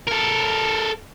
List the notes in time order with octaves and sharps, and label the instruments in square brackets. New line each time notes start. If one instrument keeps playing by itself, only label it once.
[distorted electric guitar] A4 A#4